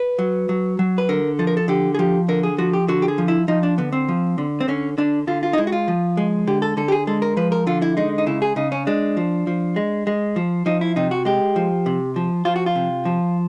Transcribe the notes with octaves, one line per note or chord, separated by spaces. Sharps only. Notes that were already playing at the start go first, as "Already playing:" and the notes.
Already playing: B4
F#3
F#3
F#3
B4
D3 A#4
F3 A4
A#4
A4
D3 G4
G#4
F3 G4
D3 A#4
G#4
F3 F#4
G4
D3 F#4
G4
G#4
F3
E4
F3 D#4
D4
D3 B3
C4
F3
D3
C4
D3 C#4
D3 D4
D3 F4
F4
D#4
G#3 E4
F#4
F4
F3
G#3
D3 G4
A4
D3 A4
G4
G#4
G#3 A4
A#4
F3 B4
A#4
D3 F4
E4
G#3 D#4
D#4
C#3 E4
G#4
C#3 D#4
C#4
G#3 D4
F3
F3
G#3
G#3
F3
F3 D#4
E4
C3 D#4
F#4
G#3 G4
F3
C3
F3
F3 F4
F#4
F4
C3
F3